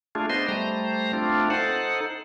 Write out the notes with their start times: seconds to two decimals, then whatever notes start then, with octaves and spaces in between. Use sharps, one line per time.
0.15 A3 D4 F4 G#4
0.30 B3 D4 C5 D#5 C6
0.49 G3 A3 C5 A#5
1.13 A3 C4 D4 F4
1.50 D#4 A4 C5 F#5